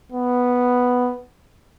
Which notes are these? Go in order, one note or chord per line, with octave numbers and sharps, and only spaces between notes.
B3